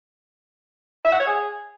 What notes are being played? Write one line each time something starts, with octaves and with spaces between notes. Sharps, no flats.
E5
F#5
C#5
G#4